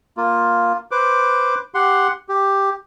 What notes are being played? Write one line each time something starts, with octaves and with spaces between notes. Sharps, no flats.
A#3 F4
B4 C5 D6
G4 F#5 C6
G4